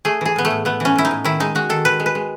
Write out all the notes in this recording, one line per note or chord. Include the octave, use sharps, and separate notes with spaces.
A3 G#4
E3 G#4
A2 B3
A3
A2
A3 B3
E3 C#4
A2 E4
D#4
A2
D#3 E4
G#3 D#4
G#3 F#4
D#3 A4
D#3 B4
G#3
B4
G#3